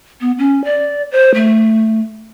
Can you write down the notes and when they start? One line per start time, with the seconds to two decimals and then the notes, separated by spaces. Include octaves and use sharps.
0.21 B3
0.38 C#4
0.64 D5
1.12 C5
1.34 A3